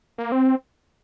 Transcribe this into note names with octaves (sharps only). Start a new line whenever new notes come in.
A#3
C4